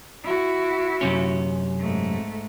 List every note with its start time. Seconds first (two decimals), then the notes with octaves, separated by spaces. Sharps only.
0.24 E4 F#4
1.01 F#2 C3 C#4
1.80 G#2 A3